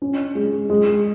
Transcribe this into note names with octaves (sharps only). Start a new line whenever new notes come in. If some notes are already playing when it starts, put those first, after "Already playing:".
C#4
G#3
G#3